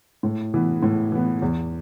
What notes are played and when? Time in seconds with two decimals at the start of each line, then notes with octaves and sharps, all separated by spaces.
0.23 A2
0.54 E3 B3
0.83 A2
1.12 E3 B3
1.42 E2